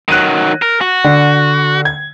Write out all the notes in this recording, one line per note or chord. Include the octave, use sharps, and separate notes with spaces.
D#3 F#3 F#6 D#7
A#4
F#4
D3
G#6